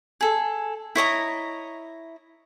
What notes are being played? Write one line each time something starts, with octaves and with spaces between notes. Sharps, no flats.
G#4 A4
E4 C#5 D#5 A#5